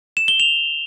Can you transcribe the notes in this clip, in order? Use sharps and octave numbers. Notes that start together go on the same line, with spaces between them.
E7
G7
F7